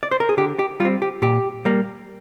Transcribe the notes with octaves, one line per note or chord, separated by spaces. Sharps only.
D5
C5
A#4
G#4
D3 G4
G4
G3 F4
C4
G4
A#2 G4
G3 A#3